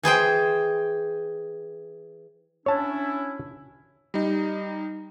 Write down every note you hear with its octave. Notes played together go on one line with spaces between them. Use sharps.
E3 G#4 C5 G5
C#4 D4 E4 C#5 A5
G3 D#4